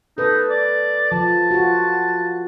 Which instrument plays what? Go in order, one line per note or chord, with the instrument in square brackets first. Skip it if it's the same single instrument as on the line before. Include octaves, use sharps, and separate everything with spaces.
[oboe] D#4 [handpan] A4 B4
[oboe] D5
[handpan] F3 [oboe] A5
[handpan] F4 F#4